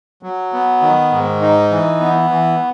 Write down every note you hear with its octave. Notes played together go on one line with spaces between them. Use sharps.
F#3
B3
D#3
G#2
D#4
E3
B3
E3